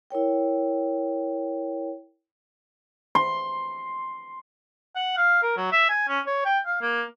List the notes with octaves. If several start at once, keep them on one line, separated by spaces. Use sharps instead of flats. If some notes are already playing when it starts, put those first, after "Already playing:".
E4 A#4 C#5 G5
C6
F#5
F5
A#4
F#3
E5
G#5
C#4
C#5
G5
F5
A#3